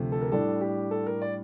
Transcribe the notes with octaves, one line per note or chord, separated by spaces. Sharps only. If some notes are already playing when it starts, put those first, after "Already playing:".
Already playing: D2 C3 F3 A3
A4
A#4
A2 G3 D4 A4
G4
A4
A#4
D5